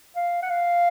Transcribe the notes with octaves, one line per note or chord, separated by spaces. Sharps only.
F5
F#5
F5